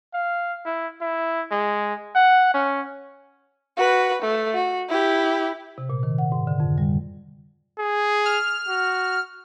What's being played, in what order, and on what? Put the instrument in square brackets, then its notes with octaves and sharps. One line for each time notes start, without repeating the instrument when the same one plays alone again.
[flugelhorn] F5
E4
E4
G#3
F#5
C#4
[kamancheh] F#4 B4
A3
F#4
E4 G4
[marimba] C3
A#2
D#3
F#5
G#2
D3
F2
G3
[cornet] G#4
[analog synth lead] F6
[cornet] F#4